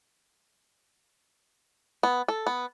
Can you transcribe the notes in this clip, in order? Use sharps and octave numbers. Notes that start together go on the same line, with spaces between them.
B3
A4
B3